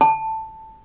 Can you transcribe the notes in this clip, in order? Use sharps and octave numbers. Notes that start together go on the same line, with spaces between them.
A5